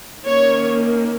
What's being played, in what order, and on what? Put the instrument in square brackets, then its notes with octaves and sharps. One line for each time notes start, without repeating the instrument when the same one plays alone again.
[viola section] D#3 A#3 C#4 C#5